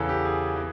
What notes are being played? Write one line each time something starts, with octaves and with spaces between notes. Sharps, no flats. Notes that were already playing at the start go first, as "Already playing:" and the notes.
Already playing: E2 C#3 E3 A4
G4
G#4
E3